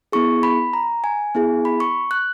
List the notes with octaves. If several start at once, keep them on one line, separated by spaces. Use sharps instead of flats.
B3 E4 G#4 C#6
B5
A#5
G#5
B3 E4 G#4
B5
C#6
F#6